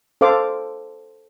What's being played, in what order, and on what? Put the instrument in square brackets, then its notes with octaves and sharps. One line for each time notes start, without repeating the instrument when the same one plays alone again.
[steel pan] A4 C5 F5 D6